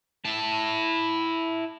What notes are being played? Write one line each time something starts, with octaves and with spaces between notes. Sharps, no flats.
E4 A5